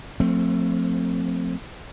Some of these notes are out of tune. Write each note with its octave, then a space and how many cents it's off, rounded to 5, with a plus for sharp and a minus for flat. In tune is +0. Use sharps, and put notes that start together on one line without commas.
F3 +30 A3 +30 C4 +0